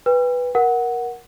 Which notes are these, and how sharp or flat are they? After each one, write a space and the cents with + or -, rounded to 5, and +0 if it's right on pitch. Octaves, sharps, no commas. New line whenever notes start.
B4 +0 G5 +35
A#4 +15 F#5 +0